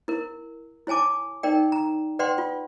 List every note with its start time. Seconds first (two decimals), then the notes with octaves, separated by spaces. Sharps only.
0.08 E4 A#4
0.87 E4 C#5 G#5 A5 D6
1.43 D#4 A#4 D5 G5
1.72 A#5
2.19 B4 D5 F#5 G5 C6
2.38 F4